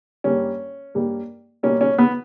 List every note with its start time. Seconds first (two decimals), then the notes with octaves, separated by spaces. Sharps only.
0.24 G2 G3 A#3 C#4
0.95 G2 G3 A#3
1.63 B2 G3 A#3 C#4
1.81 C#4
1.98 B3